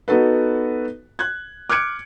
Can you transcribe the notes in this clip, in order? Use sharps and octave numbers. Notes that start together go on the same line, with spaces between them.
B3 D#4 F#4 A4 B4
F#6 G#6
D6 F6 F#6 G#6 C#7 D7